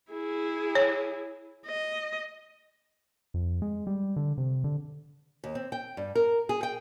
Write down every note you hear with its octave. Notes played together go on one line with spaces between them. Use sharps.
E4 G#4
C#5
D#5
F2
G#3
G3
D3
C3
D3
D#2
C4
G5
G2
A#4
G#4
G5